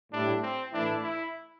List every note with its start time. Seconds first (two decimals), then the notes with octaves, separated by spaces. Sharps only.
0.12 A2 G3 D4 E4
0.42 C4
0.73 A2 E3 A3 D4 E4
1.03 E4